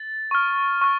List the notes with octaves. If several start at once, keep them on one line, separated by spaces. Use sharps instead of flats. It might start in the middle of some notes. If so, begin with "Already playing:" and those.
Already playing: A6
C#6 F6
C#6 F6